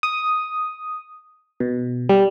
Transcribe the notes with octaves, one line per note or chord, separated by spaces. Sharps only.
D#6
B2
G3